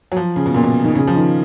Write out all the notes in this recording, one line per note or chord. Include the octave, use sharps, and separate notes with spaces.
F#3
F3
C#3
B2
A#2
B2
D#3
C#3
F3
D#3